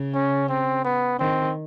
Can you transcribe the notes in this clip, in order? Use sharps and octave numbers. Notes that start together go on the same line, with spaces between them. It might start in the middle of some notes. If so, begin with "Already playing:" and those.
Already playing: C#3
C#4
C4
B3
D#3 C4